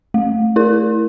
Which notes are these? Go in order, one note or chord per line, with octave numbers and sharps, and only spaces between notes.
A3
E4 A#4